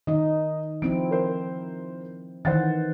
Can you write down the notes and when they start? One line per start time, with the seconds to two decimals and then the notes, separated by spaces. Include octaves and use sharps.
0.07 D#3 D#4 D#5
0.82 F3 C4 E4 D7
1.11 A#4 C5
2.45 D#3 E3 C5 F#5 A6